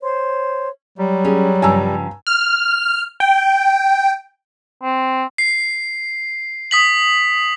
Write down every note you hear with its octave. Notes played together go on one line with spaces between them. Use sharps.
C5 C#5 C6
F#3 G3
C#4 G#4
G2 C#3 F3 G#5 A#5 E6
F6
G5
C4
C7
D#6 B6 F#7